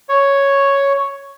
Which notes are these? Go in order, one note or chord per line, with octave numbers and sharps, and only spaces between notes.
C#5